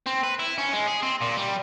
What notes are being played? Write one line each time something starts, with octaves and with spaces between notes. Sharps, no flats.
C4
B4
E4
C#4
G#3
G#4
C4
A#2
G3